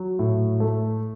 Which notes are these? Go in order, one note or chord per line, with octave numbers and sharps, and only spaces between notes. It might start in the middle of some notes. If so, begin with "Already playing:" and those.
Already playing: F#3
A2
A3